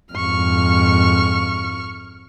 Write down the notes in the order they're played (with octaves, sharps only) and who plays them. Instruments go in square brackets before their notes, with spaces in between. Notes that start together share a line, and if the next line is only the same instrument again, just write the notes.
[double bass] F2 G#2 [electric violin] C#6 F6